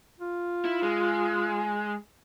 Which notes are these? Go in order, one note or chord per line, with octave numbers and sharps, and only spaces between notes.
F4
E4
G#3